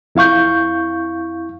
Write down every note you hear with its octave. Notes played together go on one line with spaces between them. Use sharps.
F2 E4 F5 C#6 G6